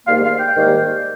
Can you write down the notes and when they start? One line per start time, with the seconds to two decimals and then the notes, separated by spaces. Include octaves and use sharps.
0.06 G#2 D#3 G3 A#3 F5
0.23 F5
0.39 G5
0.56 G#2 D#3 G3 A#3